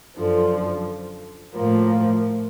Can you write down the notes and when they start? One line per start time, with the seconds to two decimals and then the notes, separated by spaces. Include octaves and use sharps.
0.15 F#2 D3 F3
1.54 A2 F3 A#3